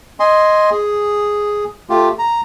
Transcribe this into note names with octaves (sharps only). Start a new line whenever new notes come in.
D#5 G#5 C6
G#4
A3 F4 G4
A#5